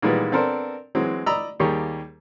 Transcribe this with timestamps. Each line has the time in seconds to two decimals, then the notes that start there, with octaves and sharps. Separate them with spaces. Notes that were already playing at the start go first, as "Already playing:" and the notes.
0.02 A#2 D#3 E3 G3 G#3 B3
0.32 B3 C4 D4 A4 A#4 C5
0.95 E3 F#3 G#3 C4
1.26 D5 D#5 A#5 B5 E6
1.60 D#2 G3 A#3 G4 G#4 C#5